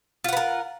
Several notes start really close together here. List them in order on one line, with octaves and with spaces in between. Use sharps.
F4 F#5 B4 A#4